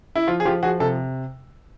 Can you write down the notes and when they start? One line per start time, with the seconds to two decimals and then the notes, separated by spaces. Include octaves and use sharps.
0.15 E4
0.28 F3 F4
0.40 G#4
0.45 F3 F4 G4
0.63 F3 F#4 G#4
0.80 C3 A4